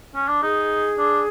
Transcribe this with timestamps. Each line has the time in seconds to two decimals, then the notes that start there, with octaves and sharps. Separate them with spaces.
0.15 C#4
0.28 D4
0.42 D#4 G#4
0.98 D4